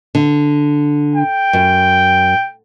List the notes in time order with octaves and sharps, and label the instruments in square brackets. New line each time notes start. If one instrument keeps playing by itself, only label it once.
[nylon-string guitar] D3
[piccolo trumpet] G5
[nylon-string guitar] F#2